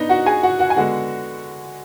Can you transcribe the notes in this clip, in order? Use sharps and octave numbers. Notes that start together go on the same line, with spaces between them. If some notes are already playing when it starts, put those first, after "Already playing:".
Already playing: B3 D4 D#4 B4 D#5
F#4 F#5
G#4 G#5
F#4 F#5
F#4 F#5
G#5
D3 G#3 B3 F#4 F#5